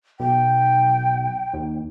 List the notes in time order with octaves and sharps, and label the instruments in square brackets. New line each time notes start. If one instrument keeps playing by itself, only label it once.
[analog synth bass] B1 [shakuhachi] G5
[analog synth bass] D#2